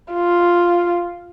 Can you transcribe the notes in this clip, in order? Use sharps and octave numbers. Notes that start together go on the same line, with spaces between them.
F4